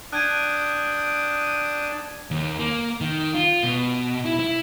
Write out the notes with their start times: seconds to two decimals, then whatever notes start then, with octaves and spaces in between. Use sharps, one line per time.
0.13 D4 G5 D#6 F#6 G#6 D#7
2.31 D#2
2.59 A#3
3.01 D#3
3.34 F4
3.63 B2
4.25 E4
4.39 E4